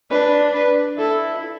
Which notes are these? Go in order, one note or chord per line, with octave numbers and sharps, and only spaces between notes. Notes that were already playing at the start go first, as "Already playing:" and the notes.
D4 B4
B4
E4 A4